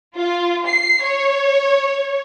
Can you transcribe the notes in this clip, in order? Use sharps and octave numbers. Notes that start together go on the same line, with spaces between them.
F4
C7
C#5